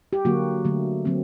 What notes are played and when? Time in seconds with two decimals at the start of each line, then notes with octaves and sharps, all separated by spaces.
0.13 G4
0.25 D3 F#3 A#3 F#4
0.64 D3 F#3 A3
1.05 D3 F#3 A#3 C4